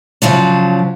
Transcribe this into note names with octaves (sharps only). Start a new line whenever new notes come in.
C#3 F3 F#3 D4